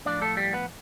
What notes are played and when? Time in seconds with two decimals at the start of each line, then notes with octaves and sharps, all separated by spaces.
0.05 A2 F3 D4 D5
0.21 A3 A4
0.37 G3 G4
0.53 B3 B4